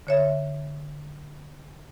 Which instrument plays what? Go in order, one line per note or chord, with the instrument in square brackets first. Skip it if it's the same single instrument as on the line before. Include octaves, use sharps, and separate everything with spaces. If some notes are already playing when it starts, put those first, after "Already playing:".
[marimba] D3 C#5 E5